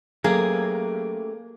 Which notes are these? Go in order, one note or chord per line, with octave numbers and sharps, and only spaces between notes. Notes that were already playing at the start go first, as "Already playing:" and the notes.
F#3 A3 A#3 C#4 G4 G#4